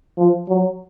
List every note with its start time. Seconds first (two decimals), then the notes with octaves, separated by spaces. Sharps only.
0.18 F3
0.49 F#3